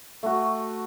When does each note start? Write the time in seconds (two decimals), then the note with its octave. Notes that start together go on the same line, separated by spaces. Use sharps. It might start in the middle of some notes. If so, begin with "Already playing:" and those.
0.23 A3 F#4